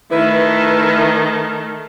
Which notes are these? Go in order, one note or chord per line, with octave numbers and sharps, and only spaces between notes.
D#3 A3 E4 B4